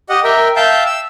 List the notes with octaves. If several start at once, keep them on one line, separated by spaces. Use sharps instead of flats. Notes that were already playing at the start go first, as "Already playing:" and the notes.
G4 D#5 F#5
A#4 E5 G5
E5 F5 G5 A5 G6
E6